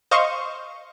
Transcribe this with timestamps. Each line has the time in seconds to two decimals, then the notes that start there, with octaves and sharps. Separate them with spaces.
0.11 C5 D#5 F5 C#6